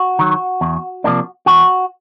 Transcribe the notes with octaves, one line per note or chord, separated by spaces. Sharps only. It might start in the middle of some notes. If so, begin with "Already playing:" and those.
Already playing: F#4
D#3 F#3
E2
C3 F3 A#3 D4
E2 F#4